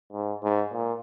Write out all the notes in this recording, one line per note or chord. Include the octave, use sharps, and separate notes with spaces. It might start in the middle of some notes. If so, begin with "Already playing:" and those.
G#2
G#2
A#2